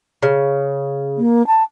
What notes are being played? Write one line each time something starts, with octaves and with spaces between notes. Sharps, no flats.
C#3
A#3
A5